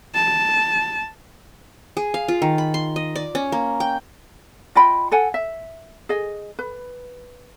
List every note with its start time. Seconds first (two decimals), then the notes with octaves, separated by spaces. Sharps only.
0.15 A5
1.97 G#4
2.14 F5
2.28 F4
2.42 D#3
2.58 B5
2.74 C6
2.96 D#5
3.16 D5
3.35 C#4
3.52 A#3
3.80 G5
4.75 F4 D#5 G5 B5
5.11 A4 F#5 G#5
5.34 E5
6.09 G#4 D#5
6.59 B4